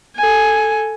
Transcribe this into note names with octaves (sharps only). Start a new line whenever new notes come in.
A4 G#5